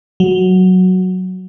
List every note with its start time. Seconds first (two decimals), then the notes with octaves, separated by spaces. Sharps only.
0.20 F#3